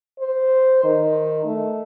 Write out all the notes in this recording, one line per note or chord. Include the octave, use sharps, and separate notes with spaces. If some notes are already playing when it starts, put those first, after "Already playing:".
C5
D#3
A3